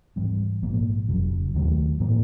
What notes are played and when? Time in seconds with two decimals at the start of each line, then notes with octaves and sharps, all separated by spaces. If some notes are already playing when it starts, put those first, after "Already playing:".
0.16 G#2 E3 G3 C4
0.62 A#1 G#2 F3 A#3
1.08 F1 F2 C#3 F#3
1.54 D#2 D#3 F#3 A3
2.00 A2 F3 A#3